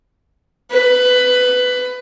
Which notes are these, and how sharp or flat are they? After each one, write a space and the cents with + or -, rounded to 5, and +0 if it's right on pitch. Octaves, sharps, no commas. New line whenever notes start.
B4 +15